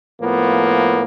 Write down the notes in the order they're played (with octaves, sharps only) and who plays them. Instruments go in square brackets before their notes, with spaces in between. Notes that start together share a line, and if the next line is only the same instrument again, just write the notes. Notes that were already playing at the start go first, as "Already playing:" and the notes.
[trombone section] A2 F3 A#3 B3